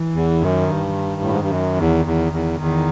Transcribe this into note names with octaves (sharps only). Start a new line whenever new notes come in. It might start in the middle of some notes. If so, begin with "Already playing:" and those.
Already playing: E3
E2
F#2 D#3
G2
D#3
A2
G#2
G2
F#2
E2
E2
E2
E2 D#3